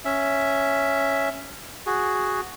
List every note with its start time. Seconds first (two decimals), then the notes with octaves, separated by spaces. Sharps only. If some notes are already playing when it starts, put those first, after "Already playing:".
0.05 C#4 E5
1.86 F#4 G#4